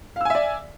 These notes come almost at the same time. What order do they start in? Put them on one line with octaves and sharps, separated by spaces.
F5 E6 G#5 E5 D5